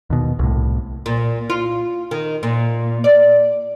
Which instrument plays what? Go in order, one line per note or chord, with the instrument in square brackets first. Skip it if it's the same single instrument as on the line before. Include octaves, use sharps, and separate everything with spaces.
[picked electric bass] D#2 B2
C2 A2
[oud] A#2
F4
D#3
A#2
D5